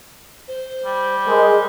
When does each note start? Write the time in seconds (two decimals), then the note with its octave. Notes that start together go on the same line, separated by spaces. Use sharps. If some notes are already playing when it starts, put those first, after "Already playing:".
0.48 C5
0.86 G3
1.27 G#3 A#4